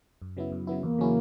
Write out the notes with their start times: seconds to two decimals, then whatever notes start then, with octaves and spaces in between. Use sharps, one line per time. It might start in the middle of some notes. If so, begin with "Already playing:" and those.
0.22 F#2
0.37 C#3 F#3 B3 E4
0.52 F#2
0.67 C#3 F#3 B3 E4
0.83 E2 A#3
0.98 C#3 F#3 C#4 E4